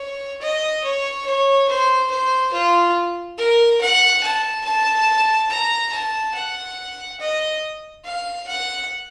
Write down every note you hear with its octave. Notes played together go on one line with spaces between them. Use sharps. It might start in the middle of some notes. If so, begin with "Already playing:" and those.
Already playing: C#5
D#5
C#5
C#5
C5
C5
F4
A#4
F#5
A5
A5
A#5
A5
F#5
D#5
F5
F#5